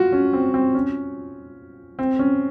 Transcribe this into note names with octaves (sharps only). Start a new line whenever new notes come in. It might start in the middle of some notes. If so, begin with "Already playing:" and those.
Already playing: F4 F#4
C#4
C4
C4
C#4
C4
C#4